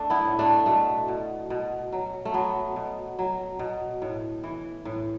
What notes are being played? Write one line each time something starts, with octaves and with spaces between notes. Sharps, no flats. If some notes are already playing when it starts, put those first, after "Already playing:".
Already playing: A3 D4
B3 E4
A2
A3 D4
B2 A3
B2
B2
F#3
A3
F#3 B3
B2
F#3
B2
A2
E3
A2